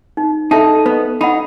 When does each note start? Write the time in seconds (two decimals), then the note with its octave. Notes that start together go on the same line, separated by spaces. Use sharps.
0.17 D#4
0.51 D#4 A4 E5 A5
0.86 B3 B4
1.21 D#4 F#5 B5